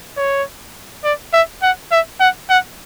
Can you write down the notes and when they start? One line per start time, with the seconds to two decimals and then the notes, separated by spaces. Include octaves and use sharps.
0.17 C#5
1.04 D5
1.33 E5
1.62 F#5
1.92 E5
2.20 F#5
2.49 F#5